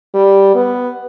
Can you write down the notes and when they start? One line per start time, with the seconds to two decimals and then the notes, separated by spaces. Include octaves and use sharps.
0.14 G3
0.55 B3